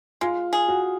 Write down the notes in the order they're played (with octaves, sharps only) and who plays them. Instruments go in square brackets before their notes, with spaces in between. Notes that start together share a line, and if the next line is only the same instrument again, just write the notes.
[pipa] G#3 [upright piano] F4
[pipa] G#4
[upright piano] F#4